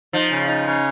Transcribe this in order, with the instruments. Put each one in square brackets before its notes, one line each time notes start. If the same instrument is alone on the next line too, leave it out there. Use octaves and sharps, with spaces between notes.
[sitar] F3 [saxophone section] D#4
[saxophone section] C#3
D#4
C#3